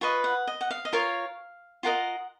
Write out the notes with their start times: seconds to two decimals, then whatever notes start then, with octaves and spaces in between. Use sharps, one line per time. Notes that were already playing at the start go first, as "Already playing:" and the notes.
0.01 F4 B4 D#5 C#6
0.24 F#5
0.47 D#5
0.61 F#5
0.71 F5
0.85 D#5
0.93 F4 A#4 C#5 F5
1.83 F4 A#4 D#5 F#5